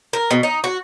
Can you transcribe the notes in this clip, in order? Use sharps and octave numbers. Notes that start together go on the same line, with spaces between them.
A#4
B2
D#4
F#4